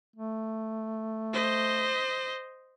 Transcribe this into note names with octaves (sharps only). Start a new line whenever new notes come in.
A3
C5 D#5